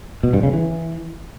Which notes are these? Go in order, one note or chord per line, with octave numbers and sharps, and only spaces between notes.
B2
G2
C#3
E3